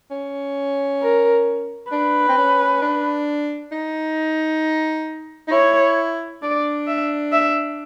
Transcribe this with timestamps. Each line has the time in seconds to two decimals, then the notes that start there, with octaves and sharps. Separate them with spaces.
0.11 C#4
1.02 A#4
1.92 D4 B4
2.29 C4
2.37 C#4
2.82 D4
3.72 D#4
5.48 D#4
5.52 E4 C#5
6.42 D4 D5
6.87 E5
7.32 E5